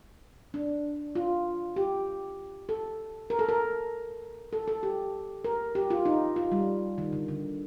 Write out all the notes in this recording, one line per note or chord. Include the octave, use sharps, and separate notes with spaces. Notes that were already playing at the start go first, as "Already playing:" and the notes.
D4
F4
G4
A4
A#4
A4
A#4
A4
A4
G4
A#4
G4
F4
D#4
F4
G3
D#3
D3
D3